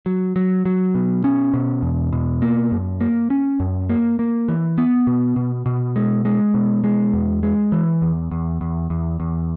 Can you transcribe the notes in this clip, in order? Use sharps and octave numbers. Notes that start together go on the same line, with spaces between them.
F#3
F#3
F#3
B2
C#4
B2
E2
B2
A#3
F#2
A#3
C#4
F#2
A#3
A#3
E3
B3
B2
B2
B2
G#3
G#3
B2
G#3
E2
G#3
E3
E2
E2
E2
E2
E2